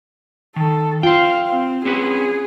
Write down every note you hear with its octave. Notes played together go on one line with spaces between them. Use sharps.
D#3 A4
F4 C5 F5 G5
C4
C4 C#4 G#4 B4